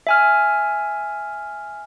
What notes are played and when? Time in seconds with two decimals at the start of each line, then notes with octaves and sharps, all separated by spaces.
0.07 E5 G#5 F6